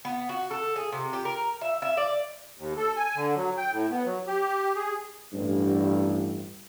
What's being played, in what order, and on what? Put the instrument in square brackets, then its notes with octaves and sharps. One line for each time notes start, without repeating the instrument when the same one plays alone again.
[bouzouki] B3
F#4
A4
G#4
C3
G4
A#4
E5
E5
D5
[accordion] D#2
A4
G#5
D3
F#3
G5
A2
B3
F#3
G4
G#4
[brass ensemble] A1 G2